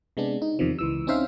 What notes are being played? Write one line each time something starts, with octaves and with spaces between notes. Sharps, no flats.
C3 G#3 B3 D4
D#4
E2 C3 D#3 F3
C#2 E3 E6
C4 C#4 D#4 C5 E5 F5